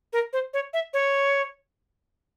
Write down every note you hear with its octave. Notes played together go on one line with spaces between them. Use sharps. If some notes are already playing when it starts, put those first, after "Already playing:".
A#4
C5
C#5
E5
C#5